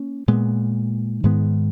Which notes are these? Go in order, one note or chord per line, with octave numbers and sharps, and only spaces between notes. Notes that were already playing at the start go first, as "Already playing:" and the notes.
Already playing: A#3 C#4
A#2 G#3 B3
G#2 D#3 G#3 B3